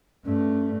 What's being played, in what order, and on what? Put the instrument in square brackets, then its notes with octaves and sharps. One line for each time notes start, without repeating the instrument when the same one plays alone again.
[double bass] G2 A3 [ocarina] C#4